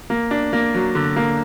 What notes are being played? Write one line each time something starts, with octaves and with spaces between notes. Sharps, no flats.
A#3
D4
A#3
F#3
D3
A#3